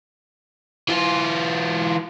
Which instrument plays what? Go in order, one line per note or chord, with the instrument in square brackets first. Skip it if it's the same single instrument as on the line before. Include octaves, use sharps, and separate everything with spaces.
[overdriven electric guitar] E3 F4